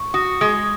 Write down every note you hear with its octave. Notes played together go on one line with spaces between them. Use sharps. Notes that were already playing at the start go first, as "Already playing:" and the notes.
Already playing: C#6
F#4 D#6
G#3 D#6